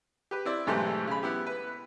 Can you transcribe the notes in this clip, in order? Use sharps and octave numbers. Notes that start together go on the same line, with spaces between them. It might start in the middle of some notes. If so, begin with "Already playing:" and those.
G4 B4
C4 E4 D5
B1 G#2 E3 A3 C4 G4
C#3 B5
B3 E4 G4
B4